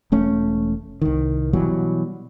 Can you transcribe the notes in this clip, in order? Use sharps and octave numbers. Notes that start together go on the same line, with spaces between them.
E1 A3 C#4
C2 D#3
B2 E3 F#3 G3